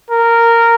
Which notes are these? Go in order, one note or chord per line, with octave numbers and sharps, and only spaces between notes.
A#4